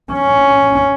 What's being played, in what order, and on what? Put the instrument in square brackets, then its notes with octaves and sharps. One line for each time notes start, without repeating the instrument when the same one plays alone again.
[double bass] C#4